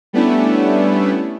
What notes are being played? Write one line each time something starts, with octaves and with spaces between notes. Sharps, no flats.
G3 A3 B3 C#4 D4 E4